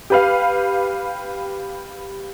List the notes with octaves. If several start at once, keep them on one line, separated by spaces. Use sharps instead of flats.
G4 B4 F5